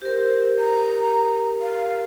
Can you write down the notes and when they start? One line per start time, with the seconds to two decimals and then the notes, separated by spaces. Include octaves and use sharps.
0.02 G4 A#4 C5
0.59 A#5
1.61 F5